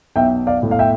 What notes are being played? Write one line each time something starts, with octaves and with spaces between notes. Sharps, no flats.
B1 E5 G5
D5 F5
A2
F5
E5 G5